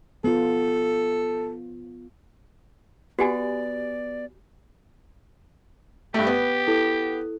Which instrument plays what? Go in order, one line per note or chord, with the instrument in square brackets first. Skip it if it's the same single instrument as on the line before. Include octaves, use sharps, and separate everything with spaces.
[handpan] B3 F4 [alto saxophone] A4
[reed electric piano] B3 [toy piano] F#4 G4 G#5 [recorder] D5
[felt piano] G2 A3 [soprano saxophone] G4
[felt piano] B3
[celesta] E4 A4